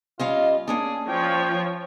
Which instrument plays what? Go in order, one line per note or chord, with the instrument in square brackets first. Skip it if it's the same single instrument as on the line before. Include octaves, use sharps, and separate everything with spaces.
[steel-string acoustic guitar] G3 C#4 D#5 [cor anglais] F4
[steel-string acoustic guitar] A#3 C#4 D4 [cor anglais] G#4
[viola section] F3 C#5 [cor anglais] G5